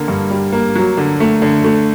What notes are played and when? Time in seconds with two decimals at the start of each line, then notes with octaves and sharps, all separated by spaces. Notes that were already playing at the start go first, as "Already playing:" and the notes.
Already playing: D3 A#3
0.08 G2
0.30 G3
0.52 A#3
0.76 F#3
0.97 D3
1.20 A3
1.42 D3
1.64 A3